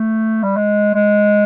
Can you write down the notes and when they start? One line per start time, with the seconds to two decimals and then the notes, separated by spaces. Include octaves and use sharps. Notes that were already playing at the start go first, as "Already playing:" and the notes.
Already playing: A3
0.44 G3
0.57 G#3
0.94 G#3